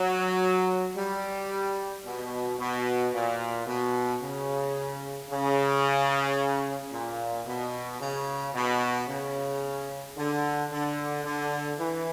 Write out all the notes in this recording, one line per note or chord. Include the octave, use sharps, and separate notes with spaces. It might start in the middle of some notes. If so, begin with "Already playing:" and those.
Already playing: F#3
G3
B2
B2
A#2
B2
C#3
C#3
A#2
B2
C#3
B2
C#3
D3
D3
D3
E3